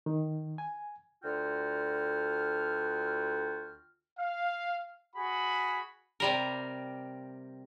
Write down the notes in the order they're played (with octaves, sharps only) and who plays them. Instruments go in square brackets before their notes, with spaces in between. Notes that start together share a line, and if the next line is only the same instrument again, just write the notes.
[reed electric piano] D#3
G#5
[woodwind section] D2 D3 F4 F#4 G5 F6
[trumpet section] F5
F#4 G#4 B5
[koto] C3 G3 A#4